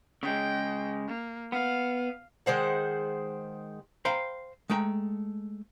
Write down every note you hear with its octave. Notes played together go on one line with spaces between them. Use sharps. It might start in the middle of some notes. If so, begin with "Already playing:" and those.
C#3 G#3 G5
A#3
B3 F5
D#3 G#3 C5 F#5
C5 F5 G5 A#5 B5
G#3 A3 G5 A#5